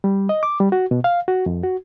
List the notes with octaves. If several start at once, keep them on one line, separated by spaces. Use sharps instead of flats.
G3
D#5
D6
G3
F#4
B2
F5
F#4
F2
F#4